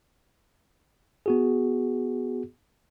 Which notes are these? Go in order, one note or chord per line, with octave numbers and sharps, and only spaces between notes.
B3 F#4 G#4